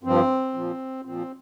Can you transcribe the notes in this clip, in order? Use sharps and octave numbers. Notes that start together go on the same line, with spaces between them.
G2 F3 C4
A#2 F3
A#2 F3 C4